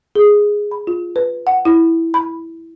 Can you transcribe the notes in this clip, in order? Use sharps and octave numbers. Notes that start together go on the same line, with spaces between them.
G#4
B5
F4
B4
F#5
E4
B5